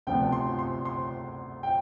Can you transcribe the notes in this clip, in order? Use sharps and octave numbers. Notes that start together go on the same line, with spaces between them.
D2 C3 F3 B3 D4 G5
C6
C6
C6
G5